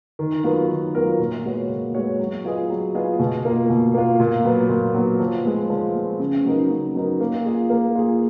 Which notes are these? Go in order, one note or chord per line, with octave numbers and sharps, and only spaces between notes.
D#3
F#3 B3 F4 A#4
D#3
F#3 B3 F4 A#4
A#2
G#3 B3 F#4 C#5
A#2
G#3 B3 F#4 C#5
F#3
B3 F4 G#4 D#5
F#3
B3 F4 G#4 D#5
B2
A#3 F4
B2
A#3 F4
A#2
F#3 B3
A#2
F#3 B3
F3
G#3 B3
F3
G#3 B3
C#3
F#3 B3 D#4 A#4
C#3
F#3 B3 D#4 A#4
A#3
F4 G#4
A#3
F4 G#4